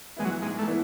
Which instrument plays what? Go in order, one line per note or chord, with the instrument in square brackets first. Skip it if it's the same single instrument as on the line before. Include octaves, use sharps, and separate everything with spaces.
[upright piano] E3 B3 E4 [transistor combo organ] G#3
[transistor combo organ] F#3
[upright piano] G#2 [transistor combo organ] G#3
[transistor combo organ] A3
[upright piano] E3 B3 E4